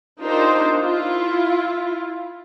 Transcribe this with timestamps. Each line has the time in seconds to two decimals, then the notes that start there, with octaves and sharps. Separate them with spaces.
0.21 D4 D#4 F4 G4 A#4 C5
0.80 E4 F4